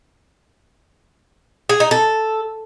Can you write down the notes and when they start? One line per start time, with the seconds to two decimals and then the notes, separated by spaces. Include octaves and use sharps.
1.69 G#4
1.80 D#4
1.91 A4